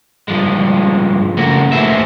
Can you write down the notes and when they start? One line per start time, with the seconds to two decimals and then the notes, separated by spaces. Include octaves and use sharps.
0.28 G2 F3 G#3
1.37 C#3 A3 A#3 F#4
1.72 D2 F3 D#4 G#4 B4 E5